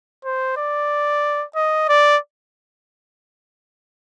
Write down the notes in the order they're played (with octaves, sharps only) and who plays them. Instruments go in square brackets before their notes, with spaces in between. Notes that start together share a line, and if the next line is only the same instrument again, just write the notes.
[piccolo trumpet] C5
D5
D#5
D5